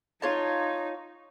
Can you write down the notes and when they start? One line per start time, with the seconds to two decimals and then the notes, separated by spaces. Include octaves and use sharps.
0.22 D#4 F4 C#5 A5